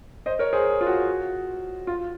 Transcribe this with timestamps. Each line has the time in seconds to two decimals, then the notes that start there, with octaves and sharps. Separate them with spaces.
0.26 C5 D#5
0.39 A#4 C#5
0.53 G#4 C5
0.81 F4
0.87 F#4
1.87 F4